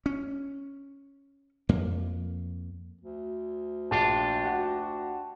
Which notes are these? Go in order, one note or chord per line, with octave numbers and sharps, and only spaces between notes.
C#4
F2 A#3
D2
A#1 D4 F4 G4 A5
F#4